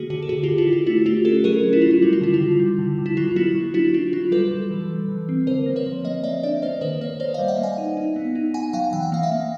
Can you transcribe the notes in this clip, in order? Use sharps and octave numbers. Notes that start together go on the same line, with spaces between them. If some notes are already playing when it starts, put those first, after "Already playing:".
Already playing: D3 A#3 F#4 G#4
D3 F#4 G#4
A4
D3 F#4 G#4
F4 G4
D3
E4 F#4
D3
F4
A3 E4 F#4
A3 F4 G4
C#4 G4 A4
F#3 G#4 A#4
C#4
E4
F#3 F4
E4
G3 F#4
F4
D3 E4
F4
D3
G3
D3
D3
E4
F#3 F4
A#3 E4 F#4
F#3
D4 E4 F#4
D4 F4
F#3 F4
G3 A4 B4
G3
E3
G3
E3
C4
D3 A#4 C5
A#3
B4 C#5
F3
A#3 C#5 D#5
A#3 D5 E5
D4 D5 E5
A#3 C5 D5
D#3 B4 C#5
A#3 B4 C#5
A#3 C5 D5
D#5 F5
G3
E5 F#5
A#3
F#5 G#5
D#4
D#4
B3
D#4
D#4 F#5 G#5
F#3 F5 G5
E3 G5
F#5
A#3 F5
E5 F#5
A#3